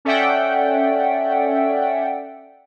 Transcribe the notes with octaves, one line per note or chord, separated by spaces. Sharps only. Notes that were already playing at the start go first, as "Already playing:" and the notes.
C#4 A4 D5 E5 F#5 G5